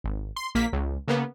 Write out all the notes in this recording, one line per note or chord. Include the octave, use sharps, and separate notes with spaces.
G#1
C6
A#1 A#3 B6
C#2
C#3 A#3 B3